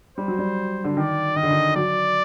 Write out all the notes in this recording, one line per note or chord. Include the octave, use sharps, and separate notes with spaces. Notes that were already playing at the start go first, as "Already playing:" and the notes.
G3 C5
F#3
G3
D3
D#3 D5
D#3 D#5
D3
D#3
F#3 D5